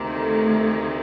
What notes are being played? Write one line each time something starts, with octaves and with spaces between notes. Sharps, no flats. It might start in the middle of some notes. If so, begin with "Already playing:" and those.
Already playing: D2 C3 D#3 A#3
A3